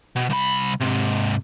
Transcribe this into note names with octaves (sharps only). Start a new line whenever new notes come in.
B2
C2 B5
G#2 C3